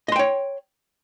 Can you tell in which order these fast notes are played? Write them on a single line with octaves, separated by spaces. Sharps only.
D#5 C6 G5 C#5